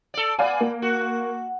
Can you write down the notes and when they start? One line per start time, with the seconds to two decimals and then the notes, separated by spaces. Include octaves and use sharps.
0.14 A4 D5
0.39 B3 D5 F5 G#5
0.61 A#3
0.82 F#4